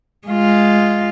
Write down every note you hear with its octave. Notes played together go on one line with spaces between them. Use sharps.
G#3 F4